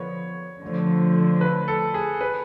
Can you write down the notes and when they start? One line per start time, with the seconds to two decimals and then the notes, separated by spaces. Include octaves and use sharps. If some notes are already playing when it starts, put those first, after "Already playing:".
Already playing: D3 F3 B3 C#5
0.62 D3 F3 A3
1.41 B4
1.68 A4
1.94 G#4
2.21 B4